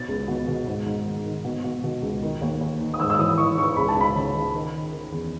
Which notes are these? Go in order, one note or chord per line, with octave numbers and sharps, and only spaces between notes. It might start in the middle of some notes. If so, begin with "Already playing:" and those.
Already playing: B2 A6
C#2
B2
B2
G#2
G#2
D#3
D#3
B2
B2
B2
C#2
D#3
D#2
D#2
D#3
D#6
G#2 E6
E6
E3 D#6
E3 C#6
E3 C#6
C#2 B5
A5
C#2 B5
C#3
C#3
D#3
D#3
D#3
E2